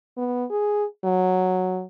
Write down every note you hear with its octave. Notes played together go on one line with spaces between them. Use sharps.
B3
G#4
F#3